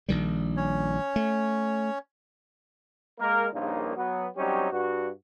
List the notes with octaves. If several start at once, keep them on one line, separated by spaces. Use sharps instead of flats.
A#1 D#3 G3
C#4 C#5
A3
G#3 A#3 A#4
A#1 G2 A#2 C#3 A#3 D#4
F#3 B3
F#3 G3 C4 C#4 D#4 G4
G2 F#4